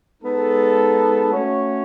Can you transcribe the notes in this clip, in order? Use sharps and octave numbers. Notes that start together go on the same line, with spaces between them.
G#3 B3 D#4 A4
A3 C#4 F#4 C#5